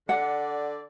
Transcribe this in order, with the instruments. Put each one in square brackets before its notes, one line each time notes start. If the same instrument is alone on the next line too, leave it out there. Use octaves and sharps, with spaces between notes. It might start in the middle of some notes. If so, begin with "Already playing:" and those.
[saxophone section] D3 D5 [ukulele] F#5